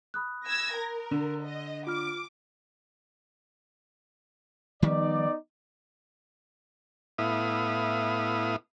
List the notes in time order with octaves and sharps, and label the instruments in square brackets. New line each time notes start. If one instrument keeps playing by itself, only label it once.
[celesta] B5 D#6 F#6
[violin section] E6 G#6 A#6
A#4
[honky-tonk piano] D3
[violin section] D#5
[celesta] F4 F6 [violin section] D6
[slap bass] D#3 F3 G3 [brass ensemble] B3 D#4 D5
[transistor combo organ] A2 B3 E4 F5 D#6